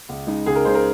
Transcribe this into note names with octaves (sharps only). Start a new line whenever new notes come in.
C#2
C#3 G#3 D#4
C#2 G#4
A#4
C#3 G#3 D#4 C5
A#4